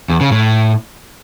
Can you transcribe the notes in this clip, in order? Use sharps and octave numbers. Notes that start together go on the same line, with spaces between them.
E2
C#3
A2